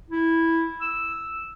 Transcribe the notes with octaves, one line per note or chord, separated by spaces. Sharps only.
E4
E6